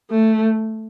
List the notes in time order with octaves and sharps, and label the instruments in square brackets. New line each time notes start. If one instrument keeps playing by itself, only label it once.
[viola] A3